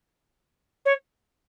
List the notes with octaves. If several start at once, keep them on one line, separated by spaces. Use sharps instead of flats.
C#5